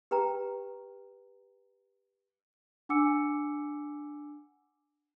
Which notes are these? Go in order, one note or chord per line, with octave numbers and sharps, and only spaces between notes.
G4 B4 G5 A#5
D4 F#5 G#5 D6 E6 C#7